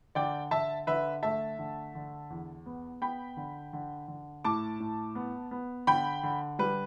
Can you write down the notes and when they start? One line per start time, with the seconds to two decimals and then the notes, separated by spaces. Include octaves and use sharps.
0.15 D3 D5 G5
0.51 D3 E5 A5
0.87 D3 B4 E5
1.23 A3 E5 A5
1.59 D3
1.95 D3
2.30 E2
2.66 B3
3.01 B3 G5 B5
3.37 D3
3.73 D3
4.08 D3
4.44 A2 A5 D6
4.80 A2
5.15 B3
5.51 B3
5.87 D3 G5 B5
6.23 D3
6.59 G3 B4